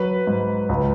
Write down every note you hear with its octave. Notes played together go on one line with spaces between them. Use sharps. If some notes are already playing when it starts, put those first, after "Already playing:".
Already playing: F#3 B4
G#2
C#2